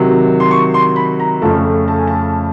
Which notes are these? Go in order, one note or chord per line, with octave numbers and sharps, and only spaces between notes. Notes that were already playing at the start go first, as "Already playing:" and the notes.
Already playing: C3 D#3 F#3
C6
C#6
C6
B5
A#5
F2 C#3 F3 A3 A5
A5
G#5
A5